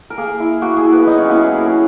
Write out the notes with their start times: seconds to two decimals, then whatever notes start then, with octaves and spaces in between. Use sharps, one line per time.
0.10 A#4
0.18 A#3 G#4
0.40 E4
0.62 A#3 F#4
0.77 G#4
0.84 E4
0.92 B3 B4
1.06 F#3 D#4 D#5
1.18 C#4 C#5
1.29 A#3 B3 E4 B4
1.41 G#4
1.51 F#3 A#4
1.66 G#4